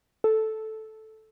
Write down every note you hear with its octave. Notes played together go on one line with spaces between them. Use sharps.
A4